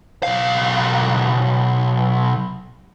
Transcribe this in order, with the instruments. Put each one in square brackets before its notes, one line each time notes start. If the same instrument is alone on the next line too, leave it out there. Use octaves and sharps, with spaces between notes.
[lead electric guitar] B1 F5